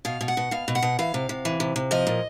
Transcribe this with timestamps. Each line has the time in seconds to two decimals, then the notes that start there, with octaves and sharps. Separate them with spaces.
0.05 B2 F5
0.21 B2
0.28 F#5
0.37 B2
0.51 B2 F5
0.68 B2
0.75 F#5
0.82 B2
0.99 E3 F5
1.14 C3
1.29 C3
1.45 E3
1.60 C3
1.76 C3
1.91 F3 D#5
2.07 A#2